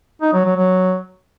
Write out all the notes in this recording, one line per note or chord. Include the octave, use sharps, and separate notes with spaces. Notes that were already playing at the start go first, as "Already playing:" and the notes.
D#4
F#3
F#3
F#3